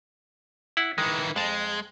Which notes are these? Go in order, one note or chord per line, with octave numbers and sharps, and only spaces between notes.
E4 F#5
D#3 E3 G#3
F2 G#3 A5